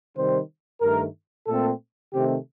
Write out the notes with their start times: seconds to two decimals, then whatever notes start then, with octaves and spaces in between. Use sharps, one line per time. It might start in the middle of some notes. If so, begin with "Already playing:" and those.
0.17 C3 D#3 G3 C4 C5
0.81 G2 D#3 A3 A#4
1.47 A#2 A3 C4 A4
2.13 C3 D#3 A3 C4 G4